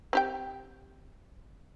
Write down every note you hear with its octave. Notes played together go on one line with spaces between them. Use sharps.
C4 G4 G5